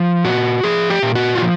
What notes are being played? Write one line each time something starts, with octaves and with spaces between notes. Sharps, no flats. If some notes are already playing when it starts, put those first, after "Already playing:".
Already playing: F3
A#2 F#4
F3 G#4
G4
A#2
F#4
F4
F3